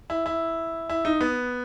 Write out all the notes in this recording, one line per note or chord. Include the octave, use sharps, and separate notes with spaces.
E4
E4
E4
D#4
B3